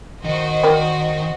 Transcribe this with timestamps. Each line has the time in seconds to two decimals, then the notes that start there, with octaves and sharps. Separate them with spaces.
0.25 D#3 F#4 C5 D#5
0.63 A#4 D5 G5